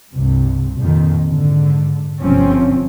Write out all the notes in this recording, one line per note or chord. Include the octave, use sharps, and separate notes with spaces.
C2 G2 C3
A#1 F2 D#3
G#2 D3
G1 C3 F3 C4 C#4